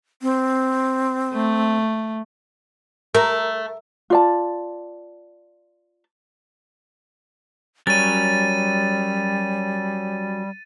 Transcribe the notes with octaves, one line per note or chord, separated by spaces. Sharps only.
C4
A3
A3 A#4
F4 D5 A5
F#3 G3 C#4 A#4 A6 D#7